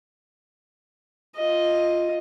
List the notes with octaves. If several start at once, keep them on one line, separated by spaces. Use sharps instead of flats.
F4 D#5